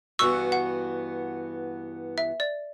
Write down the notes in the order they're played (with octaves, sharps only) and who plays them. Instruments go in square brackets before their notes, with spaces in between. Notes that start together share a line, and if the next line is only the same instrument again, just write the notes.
[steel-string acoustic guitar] G2 E3 B3 F#4 [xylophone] C#6 E6
[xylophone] F#5
E5
D5